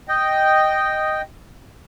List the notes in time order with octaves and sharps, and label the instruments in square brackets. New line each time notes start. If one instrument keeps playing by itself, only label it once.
[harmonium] D#5 G5